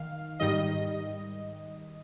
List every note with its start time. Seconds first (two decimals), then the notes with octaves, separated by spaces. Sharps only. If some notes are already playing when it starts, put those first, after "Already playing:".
Already playing: D#3 F5
0.40 G#2 D#3 G3 D#5